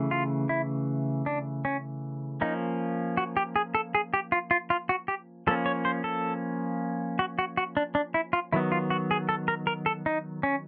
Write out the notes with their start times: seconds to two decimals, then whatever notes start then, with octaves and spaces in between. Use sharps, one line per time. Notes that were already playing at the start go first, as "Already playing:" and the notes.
Already playing: C#3 E3 A3
0.11 F4
0.49 E4
1.26 D4
1.65 C#4
2.41 F3 A#3 C#4 D#4
3.17 F#4
3.37 G4
3.56 G#4
3.75 A4
3.95 G#4
4.14 G4
4.32 F4
4.51 F4
4.70 F4
4.89 F#4
5.08 G4
5.47 F3 A#3 C#4 A4
5.66 C#5
5.85 C5
6.04 A4
7.19 F#4
7.39 F#4
7.57 F#4
7.77 D4
7.95 D4
8.14 E4
8.33 F4
8.52 D#3 F#3 B3 E4
8.72 F4
8.90 F#4
9.11 G#4
9.29 A4
9.48 A#4
9.67 A#4
9.86 A4
10.06 D#4
10.43 C#4